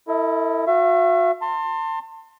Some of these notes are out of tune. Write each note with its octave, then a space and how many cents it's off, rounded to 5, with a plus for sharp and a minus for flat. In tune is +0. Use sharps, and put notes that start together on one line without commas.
E4 +0 A4 +40 D#5 +40
F#4 -30 E5 +35
A5 +35 C6 +15